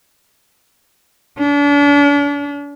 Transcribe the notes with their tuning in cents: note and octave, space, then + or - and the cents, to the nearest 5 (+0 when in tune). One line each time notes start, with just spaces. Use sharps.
D4 -40